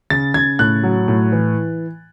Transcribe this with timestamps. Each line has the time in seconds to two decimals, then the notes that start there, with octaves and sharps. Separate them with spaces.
0.10 C#3 A6
0.34 C#3 G#6
0.59 A2 F#6
0.83 F#3
1.08 A2
1.32 E3